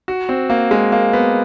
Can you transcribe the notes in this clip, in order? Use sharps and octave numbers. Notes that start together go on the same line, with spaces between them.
F#4
C4
A#3
G#3
A#3
B3